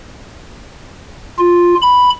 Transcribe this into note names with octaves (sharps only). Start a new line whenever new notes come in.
F4
B5